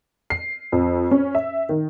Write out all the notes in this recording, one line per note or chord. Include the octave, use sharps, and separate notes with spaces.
C7
F2
C#4
E5
D#3